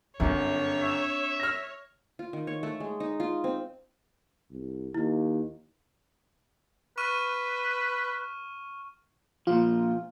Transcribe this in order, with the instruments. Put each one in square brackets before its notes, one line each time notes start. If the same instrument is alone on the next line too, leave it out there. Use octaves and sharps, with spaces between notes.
[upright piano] G1 F#2 [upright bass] C4 D4 [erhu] C#5
[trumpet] E5
[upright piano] F6 A#6
[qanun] F4
D#3
C#5
A3
G#3
D#4
F4
C4
[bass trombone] C2
[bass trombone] D#2 [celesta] E4
[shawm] B4 [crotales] C#6 F6 D#7
[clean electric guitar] A#2 F3 [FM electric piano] F4